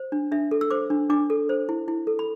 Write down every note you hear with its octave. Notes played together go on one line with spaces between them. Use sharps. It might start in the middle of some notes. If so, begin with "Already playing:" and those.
Already playing: C5
D4
D4 E5
A4
E6
C5 D6
D4
D4 D6
A4
C5
E4
E4
A4
B5